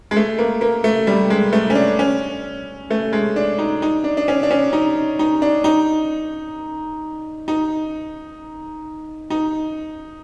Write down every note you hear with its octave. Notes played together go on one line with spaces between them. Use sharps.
G#3
A3
A#3
A#3
A3
G3
G#3
A3
C#4
D4
C#4
A3
G#3
D4
D#4
D#4
D4
D4
C#4
D4
C#4
D#4
D#4
D4
D#4
D#4
D#4